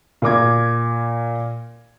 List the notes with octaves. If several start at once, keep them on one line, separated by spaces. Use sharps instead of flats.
A#2 A#4 D6 G#6